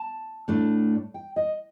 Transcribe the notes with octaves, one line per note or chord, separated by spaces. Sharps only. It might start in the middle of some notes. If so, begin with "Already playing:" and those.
Already playing: A5
A2 A3 D4
G5
D#5